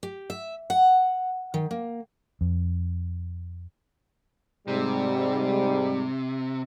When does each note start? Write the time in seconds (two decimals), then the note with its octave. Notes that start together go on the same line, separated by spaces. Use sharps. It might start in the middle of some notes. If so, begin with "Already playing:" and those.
0.03 G4
0.30 E5
0.70 F#5
1.54 D#3
1.71 A#3
2.41 F2
4.68 G#2 C3 G3